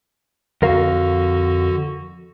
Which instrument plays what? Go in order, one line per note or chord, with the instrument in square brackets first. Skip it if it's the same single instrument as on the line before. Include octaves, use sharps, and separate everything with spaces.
[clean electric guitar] F2 A#4 F5 [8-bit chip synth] D3 F#4